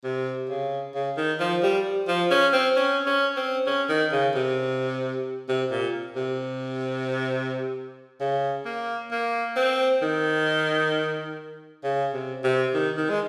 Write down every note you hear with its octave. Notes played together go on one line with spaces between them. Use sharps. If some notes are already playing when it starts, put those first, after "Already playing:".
C3
C#3
C#3
D#3
F3
G3
F3
C#4
C4
C#4
C#4
C4
C#4
D#3
C#3
C3
C3
A#2
C3
C#3
A#3
A#3
C4
D#3
C#3
C3
C3
D#3
D#3
G#3